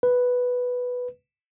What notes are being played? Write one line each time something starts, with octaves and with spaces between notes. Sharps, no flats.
B4